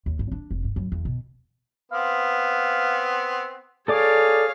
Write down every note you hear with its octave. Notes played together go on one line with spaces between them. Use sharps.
D#2
G2
D4
F1
G2
F#2
E2
B2
B3 C4 F5
G#4 A4 C#5 D5 F5 D6